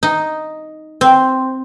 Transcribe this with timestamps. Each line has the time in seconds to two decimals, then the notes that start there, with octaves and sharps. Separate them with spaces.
0.03 D#4
1.01 C4